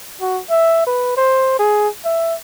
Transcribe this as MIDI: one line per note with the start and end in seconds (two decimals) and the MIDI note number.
0.21 0.40 66
0.50 0.81 76
0.87 1.17 71
1.17 1.55 72
1.59 1.88 68
2.05 2.35 76